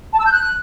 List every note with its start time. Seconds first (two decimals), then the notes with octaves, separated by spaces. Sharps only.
0.13 A5
0.19 E6
0.26 G6
0.32 F#6